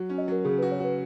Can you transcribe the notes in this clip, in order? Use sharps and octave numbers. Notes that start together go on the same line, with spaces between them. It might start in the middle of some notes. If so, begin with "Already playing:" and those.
Already playing: F#3
C#4
D#5
F#3 A#4
C#3 G#4
F#4 B4
C#5
F#4 B4